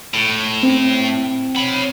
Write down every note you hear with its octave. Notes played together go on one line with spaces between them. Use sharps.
A2
C4
C#5 B5